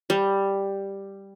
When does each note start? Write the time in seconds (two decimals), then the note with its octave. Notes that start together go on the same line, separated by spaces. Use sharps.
0.10 G3